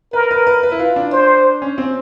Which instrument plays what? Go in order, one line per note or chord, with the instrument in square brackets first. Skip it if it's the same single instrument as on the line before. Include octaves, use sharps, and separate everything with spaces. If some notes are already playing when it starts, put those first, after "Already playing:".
[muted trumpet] A#4 [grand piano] B4
[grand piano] B4
B4
B4
E4
F4
D4
[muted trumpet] C5
[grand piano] C#4
C4